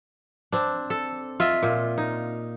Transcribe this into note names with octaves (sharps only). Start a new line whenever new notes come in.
C4 D4
A4
F4 D#5 E5
A#2
D#4